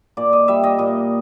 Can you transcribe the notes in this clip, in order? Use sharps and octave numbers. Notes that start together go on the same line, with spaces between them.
A#2 D5
D#5
G3 E5
D#5
A#2 D#5